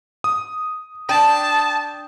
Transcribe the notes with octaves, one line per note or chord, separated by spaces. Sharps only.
D#6
D4 G5 A5 D#6